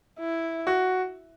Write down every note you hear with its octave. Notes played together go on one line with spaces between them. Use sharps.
E4
F#4